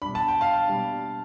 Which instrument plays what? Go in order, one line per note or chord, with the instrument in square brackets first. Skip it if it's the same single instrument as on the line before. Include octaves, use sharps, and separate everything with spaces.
[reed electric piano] B2 G3 D4 [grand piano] B5
[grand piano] A5
G5
F5 A5
[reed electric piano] B2 G3 D4